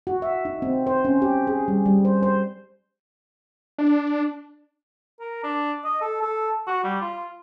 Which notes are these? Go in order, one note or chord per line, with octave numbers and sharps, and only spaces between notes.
F#4
E5
D#4
C4
C5
C#4
G4
G#4
G3
G3
C5
C5
D4
A#4
D4
D#5
A4
A4
F#4
G3
F4